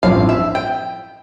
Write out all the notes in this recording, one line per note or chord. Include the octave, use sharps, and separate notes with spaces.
A1 G2 F3 C4 E4 F5
E5
G5